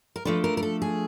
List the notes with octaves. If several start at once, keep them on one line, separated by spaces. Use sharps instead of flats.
A#4
F3 A3 D4 B4
A#4
A#4
A4
G#4